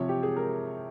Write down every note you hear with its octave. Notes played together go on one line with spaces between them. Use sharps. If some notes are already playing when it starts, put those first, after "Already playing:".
Already playing: C3 F3 C#5
G4
G#4
A#4